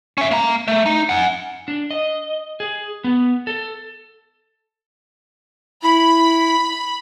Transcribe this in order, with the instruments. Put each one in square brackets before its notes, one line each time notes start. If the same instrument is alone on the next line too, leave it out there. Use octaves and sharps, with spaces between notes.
[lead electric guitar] C#4 E5
A#3 A#5
A3
D#4
F#5 G#5
[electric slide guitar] D4
D#5
G#4
B3
A4
[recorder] E4 [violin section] B5